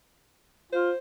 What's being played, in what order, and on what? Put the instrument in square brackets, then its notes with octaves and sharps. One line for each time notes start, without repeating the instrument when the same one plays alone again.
[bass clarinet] F4 [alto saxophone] C5